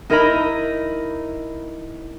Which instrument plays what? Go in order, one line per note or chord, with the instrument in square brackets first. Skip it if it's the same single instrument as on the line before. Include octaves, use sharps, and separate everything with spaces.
[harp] D#4 E4 A#4 D#5 A#5 B5